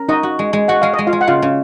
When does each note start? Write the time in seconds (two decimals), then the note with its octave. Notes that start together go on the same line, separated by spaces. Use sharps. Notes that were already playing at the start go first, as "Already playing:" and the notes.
Already playing: C#4 A#4
0.09 D#4 F#4 D#5
0.23 F#4
0.39 G#3
0.53 G#3
0.68 F#4 F#5
0.82 G#3 F5
0.94 G#3 D#5
1.07 F4 F5
1.13 G#3
1.21 F#5
1.28 C#3 F4 F5
1.42 C#3